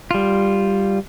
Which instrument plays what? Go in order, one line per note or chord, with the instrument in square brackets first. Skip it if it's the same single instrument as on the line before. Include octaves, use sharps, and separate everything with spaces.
[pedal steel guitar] G3 F4